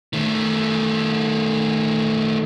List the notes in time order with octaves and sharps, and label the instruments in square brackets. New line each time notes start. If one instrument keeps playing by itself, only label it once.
[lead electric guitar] D#3 A3